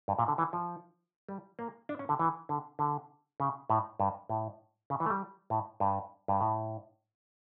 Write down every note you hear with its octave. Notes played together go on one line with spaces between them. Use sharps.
G2
A#2
D3
E3
F3
G3
A#3
D4
C#4
D3
E3
D3
D3
C#3
A2
G2
A2
C#3
E3
A3
G3
A2
G2
G2
A2